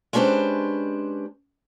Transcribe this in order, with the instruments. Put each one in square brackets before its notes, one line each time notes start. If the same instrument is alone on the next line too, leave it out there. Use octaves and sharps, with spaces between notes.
[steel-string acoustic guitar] G#3 C#4 D4 G4 B4 C5